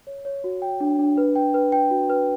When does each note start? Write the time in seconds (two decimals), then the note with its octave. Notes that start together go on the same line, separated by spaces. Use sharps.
0.07 C#5
0.25 C#5
0.44 F#4
0.62 G5
0.81 D4
0.99 D4
1.17 B4
1.36 G5
1.54 B4
1.72 G5
1.90 F#4
2.10 B4